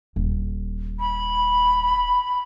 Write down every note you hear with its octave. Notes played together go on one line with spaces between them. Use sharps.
D#1
B5